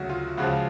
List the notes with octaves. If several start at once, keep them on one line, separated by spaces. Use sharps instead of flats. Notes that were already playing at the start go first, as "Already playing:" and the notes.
Already playing: D2 C#3 F#3 F#4
F4
C#2 C#3 F3 F#4